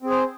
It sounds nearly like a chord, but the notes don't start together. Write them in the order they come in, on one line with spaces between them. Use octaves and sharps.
C4 G#4 C5